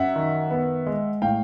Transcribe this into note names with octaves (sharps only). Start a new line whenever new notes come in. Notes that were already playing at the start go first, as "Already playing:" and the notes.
Already playing: F#2 E5 F#5
D#3
B3
G#3
A2 F5 G5